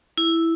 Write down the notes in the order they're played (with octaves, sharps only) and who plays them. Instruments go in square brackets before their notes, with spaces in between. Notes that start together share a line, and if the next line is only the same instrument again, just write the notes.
[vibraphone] E4